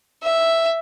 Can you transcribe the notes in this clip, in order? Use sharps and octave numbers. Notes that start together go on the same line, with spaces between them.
E5